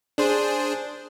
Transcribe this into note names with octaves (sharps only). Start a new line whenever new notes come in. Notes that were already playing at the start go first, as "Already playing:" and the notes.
D4 G#4 C5